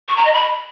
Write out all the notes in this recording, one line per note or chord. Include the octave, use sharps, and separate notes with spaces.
C#6
A#5
D#5
B5